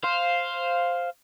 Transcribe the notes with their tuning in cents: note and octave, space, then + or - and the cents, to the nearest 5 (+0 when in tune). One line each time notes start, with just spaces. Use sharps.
C5 +0 F5 +0